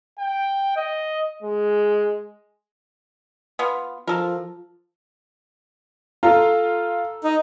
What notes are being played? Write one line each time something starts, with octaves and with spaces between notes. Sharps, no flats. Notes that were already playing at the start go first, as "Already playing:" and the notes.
G5
D#5
G#3
B3 F4
F3 A4 A#4
F4 A4 A#5
D#4